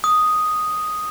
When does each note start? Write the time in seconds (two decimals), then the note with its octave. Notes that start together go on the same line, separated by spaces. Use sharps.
0.04 D#6